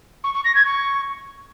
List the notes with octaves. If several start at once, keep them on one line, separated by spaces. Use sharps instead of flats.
C#6
C#6
A#6
G#6
C#6